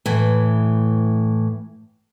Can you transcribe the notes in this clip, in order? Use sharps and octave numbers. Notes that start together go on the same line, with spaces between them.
A2 E3